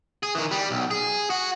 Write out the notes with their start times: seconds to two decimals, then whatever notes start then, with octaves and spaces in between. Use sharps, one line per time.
0.23 G#4
0.35 D#3 E3
0.51 G3
0.71 B1
0.91 G#4
1.30 F#4